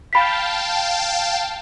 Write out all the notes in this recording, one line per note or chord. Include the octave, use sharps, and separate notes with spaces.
F5 G5 A5 B5 B6